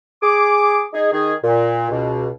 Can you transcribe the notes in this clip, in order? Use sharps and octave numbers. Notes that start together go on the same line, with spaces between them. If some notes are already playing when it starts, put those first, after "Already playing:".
G#4 D6
D#4 G#4
D#3 G#4
A#2
C#2 B2